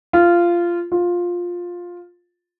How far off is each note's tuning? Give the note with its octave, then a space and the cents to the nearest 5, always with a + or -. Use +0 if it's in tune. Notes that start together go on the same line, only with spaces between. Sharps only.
F4 -15
F4 +10